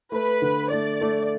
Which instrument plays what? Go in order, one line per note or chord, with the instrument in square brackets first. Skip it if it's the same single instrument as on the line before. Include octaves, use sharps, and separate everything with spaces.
[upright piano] A3 [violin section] B4
[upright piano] D3
[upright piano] A3 [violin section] D5
[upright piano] A3